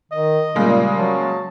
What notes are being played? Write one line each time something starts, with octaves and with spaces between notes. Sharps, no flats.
D#3 D#5
A#2 C#3 G3 G#3 A#3
F#3 A5